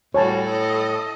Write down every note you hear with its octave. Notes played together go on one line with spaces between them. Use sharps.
A2 G3 F#4 C#5 G#5 A5
A4 D#5